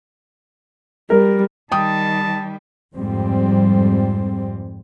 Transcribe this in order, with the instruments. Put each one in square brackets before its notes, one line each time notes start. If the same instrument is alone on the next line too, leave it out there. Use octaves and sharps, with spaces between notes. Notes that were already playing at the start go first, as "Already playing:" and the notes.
[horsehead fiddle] G3 [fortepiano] A#4
[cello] D#3 G3 [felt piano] G5 D#6 [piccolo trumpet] A5
[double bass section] F2 G#2 G3 C4